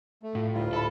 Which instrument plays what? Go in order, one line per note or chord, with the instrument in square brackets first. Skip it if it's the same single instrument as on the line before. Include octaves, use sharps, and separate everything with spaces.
[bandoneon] A3
[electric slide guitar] A2 [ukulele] F4
[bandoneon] D2 G3 F4 [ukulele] E4 A#4
[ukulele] E4 D#5 B5 [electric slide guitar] A4